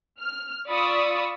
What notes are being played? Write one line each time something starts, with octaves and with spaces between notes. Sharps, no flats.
F6
F4 D5 B5 C#6 D#6 E6